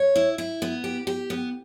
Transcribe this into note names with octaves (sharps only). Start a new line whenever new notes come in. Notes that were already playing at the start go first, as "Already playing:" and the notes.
Already playing: C#5
E4
E4
B3
G4
G4
B3